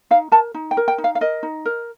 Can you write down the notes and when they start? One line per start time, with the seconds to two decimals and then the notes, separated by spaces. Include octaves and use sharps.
0.11 D#4 F5
0.32 A#4 A5
0.54 D#4
0.71 G5
0.77 A#4
0.88 G5
0.98 D#4
1.04 F5
1.15 F5
1.21 A#4 D#5
1.43 D#4
1.65 A#4